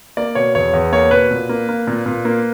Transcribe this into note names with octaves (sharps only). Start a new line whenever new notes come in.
A#3 D5
B2 C#5
E2 C#5
E2
A#3 C#5
B2 B4
A#2
A#3
A#3
A#2
A#2
A#3